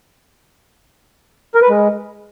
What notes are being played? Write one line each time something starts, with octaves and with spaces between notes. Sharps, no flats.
A#4
B4
G#3